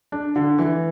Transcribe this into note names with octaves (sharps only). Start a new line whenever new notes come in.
D4
D3
E3